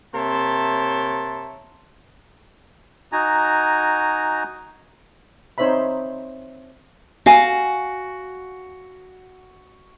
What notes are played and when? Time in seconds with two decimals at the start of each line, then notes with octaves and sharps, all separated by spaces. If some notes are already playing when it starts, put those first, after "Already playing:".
0.14 C3 A#3 C#5 E5 A5 C6
3.12 D#4 F#4 G#5 A#5
5.58 C4 D#4 C5 C#5 E5 B5
7.26 F#4 F5 G#5